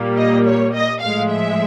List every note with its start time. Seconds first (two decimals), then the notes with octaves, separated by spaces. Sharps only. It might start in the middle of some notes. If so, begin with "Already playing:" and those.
Already playing: A#2 G3 A#3
0.17 D#5
0.46 C#5
0.74 D#5
1.01 A2 F3 G#3 F5
1.30 E5